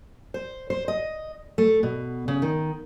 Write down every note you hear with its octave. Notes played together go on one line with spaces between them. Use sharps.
C5
C5
D#5
A3
B2
C#3
D#3